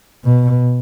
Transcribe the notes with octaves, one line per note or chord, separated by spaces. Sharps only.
B2